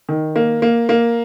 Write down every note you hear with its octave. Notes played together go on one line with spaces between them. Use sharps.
D#3
A#3
A#3
A#3